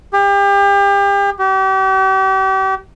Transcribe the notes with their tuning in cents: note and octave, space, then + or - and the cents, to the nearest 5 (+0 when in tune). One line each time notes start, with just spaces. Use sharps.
G4 +35
G4 -40